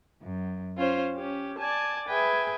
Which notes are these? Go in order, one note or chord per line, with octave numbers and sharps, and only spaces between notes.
F#2
C#4 F4 C5
C#4 G4
D5 G#5 A5
G#4 B4 E5 G5 G#5